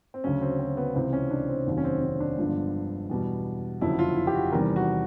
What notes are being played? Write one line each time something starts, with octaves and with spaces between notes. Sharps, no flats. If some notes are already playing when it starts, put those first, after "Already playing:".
C4
D2 C#3 F#3 C#4
C4
C4
B3
C#2 C3 E3 C4
C#4
D4
C4
F1 D#2 D#3 F#3
C#4
C4
C#4
D4
G1 G2 D3 F3 G#3
E2 B2 G3
F#1 F2 D3 F#3 E4
F4
E4
G4
F#4
E2 C3 D#3 G3 A#4
F#4